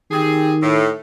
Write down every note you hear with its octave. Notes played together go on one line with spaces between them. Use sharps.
D#3 C4 G4 G#4
A2